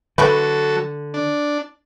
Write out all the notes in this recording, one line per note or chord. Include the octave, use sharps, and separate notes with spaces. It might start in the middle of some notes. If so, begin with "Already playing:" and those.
D3 F#3 A3 E4 A4 B4
D4